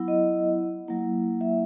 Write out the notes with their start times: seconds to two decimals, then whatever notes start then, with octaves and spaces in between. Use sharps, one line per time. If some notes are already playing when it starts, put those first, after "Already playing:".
Already playing: F#3 B3 E4
0.08 D#5
0.88 F#3 A#3 E4
1.41 E5